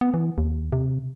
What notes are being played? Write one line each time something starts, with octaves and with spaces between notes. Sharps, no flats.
B3
E3
D#2
C3